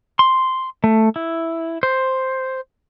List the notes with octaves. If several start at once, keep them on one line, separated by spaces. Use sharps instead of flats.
C6
A3
E4
C5